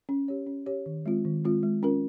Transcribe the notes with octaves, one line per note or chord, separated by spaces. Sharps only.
C#4
G4 C#5
C#4
G4 C#5
D#3
G#3 C4 F4
D#3
G#3 C4 F4
G#3
C#4 F4 A#4